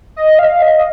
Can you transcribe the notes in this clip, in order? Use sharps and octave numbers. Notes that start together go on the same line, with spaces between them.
D#5
F5
D#5